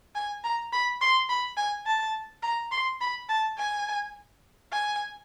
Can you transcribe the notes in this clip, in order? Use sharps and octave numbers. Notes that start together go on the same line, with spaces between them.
G#5
A#5
B5
C6
B5
G#5
A5
A#5
C6
B5
A5
G#5
G#5